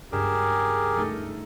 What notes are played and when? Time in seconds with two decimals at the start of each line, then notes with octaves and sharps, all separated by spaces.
0.12 C#2 G2 G4 G#4 A#4 E7
0.97 A3 D#4 A4